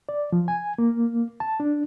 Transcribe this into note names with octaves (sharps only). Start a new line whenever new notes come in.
D5
F3
G#5
A#3
A5
D4